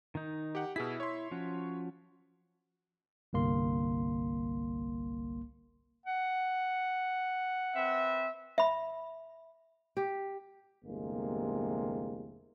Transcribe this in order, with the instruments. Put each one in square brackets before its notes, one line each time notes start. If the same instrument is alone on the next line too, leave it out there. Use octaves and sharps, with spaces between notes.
[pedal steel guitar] D#3 D#4
[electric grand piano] G4 F#5
[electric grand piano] B2 G#4 B6 [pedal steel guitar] E4 E6
[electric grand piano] C#5 C6
[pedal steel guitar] F3 C#4 F#4
[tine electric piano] G1 C2 A#3 C6
[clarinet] F#5
[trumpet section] C4 B4 E5
[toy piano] E5 B5
[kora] G4
[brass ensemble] G1 E2 C3 G#3 A#3